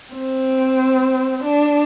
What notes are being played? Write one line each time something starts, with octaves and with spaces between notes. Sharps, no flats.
C4
D4